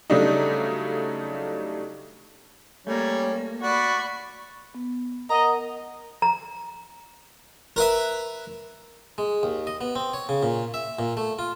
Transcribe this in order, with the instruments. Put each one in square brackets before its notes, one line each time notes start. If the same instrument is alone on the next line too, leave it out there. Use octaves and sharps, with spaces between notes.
[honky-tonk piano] C#3 F#3 G3 A3 D4 D#4
[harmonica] G3 C#4 [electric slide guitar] A3 A#3
[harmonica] F#4 D5 [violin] B5 C#6
[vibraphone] B3
[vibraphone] A#4 F#5 [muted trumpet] D#5 [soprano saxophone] A#5
[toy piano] A#5
[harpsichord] A#4 B4 E5
G#3
D#2
D#5
B3
C4
C#5
C#3
A#2
E5
A#2
A3
F4